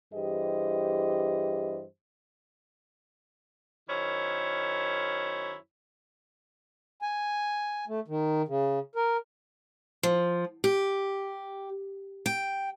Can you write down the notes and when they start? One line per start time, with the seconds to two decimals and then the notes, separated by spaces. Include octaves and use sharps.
0.14 G2 E3 G4 G#4 C5 D#5
3.89 F#2 D#3 E4 C5 C#5
7.02 G#5
7.88 A3
8.08 D#3
8.48 C#3
8.95 A#4
10.03 F3
10.64 G4
12.26 G5